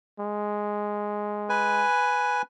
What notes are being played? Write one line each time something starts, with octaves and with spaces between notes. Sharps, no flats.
G#3
B4 G#5